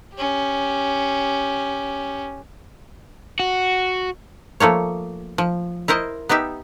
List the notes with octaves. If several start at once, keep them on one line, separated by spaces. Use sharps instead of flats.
C#4 G4
F#4
F3 A3 A#3 C#5
F3
E4 A#4 C5 D#5
B3 D#4 G4 E5